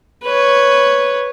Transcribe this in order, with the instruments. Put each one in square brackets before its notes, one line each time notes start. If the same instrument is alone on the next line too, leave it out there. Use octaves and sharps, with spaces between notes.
[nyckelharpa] B4 C#5